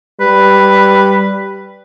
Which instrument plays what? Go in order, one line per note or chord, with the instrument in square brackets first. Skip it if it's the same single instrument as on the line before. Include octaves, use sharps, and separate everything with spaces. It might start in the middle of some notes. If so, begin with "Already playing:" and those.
[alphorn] G3 [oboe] B4